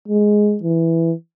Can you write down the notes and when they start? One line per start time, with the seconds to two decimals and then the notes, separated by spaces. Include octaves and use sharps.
0.08 G#3
0.63 E3